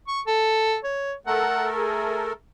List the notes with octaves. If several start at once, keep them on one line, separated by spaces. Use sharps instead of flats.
C#6
A4
C#5
A3 A4 A#4 F#5
G#4